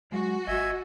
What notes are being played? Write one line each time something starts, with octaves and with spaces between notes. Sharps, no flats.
F#3 G#3 F#4
G#1 D#5 E5 G#5